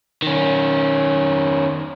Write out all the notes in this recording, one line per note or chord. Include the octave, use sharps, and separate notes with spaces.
D#3 C#4